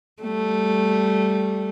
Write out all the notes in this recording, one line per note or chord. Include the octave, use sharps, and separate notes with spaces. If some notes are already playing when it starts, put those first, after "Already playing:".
G3 A3